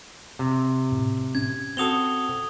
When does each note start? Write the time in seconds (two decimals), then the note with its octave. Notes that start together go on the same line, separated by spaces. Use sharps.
0.39 C3
0.92 A2
1.35 C#4 G#6
1.77 C4 F#4 A4 D#6 F7 G7